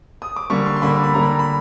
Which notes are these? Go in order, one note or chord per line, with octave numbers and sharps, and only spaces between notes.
D#6
D6
D3 G3 A#3 C#6
C6
C6
D3 G3 A#3 B5
B5
D3 G3 A#3 A#5
B5
A#5
B5